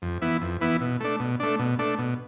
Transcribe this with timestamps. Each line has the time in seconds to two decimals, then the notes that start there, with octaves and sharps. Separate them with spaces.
0.02 F2
0.22 E3 B3 E4
0.41 F2
0.61 E3 B3 E4
0.81 B2
1.00 A3 D4
1.20 B2
1.40 A3 D4
1.59 B2
1.79 A3 D4
1.98 B2